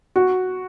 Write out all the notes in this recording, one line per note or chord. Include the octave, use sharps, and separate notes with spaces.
F#4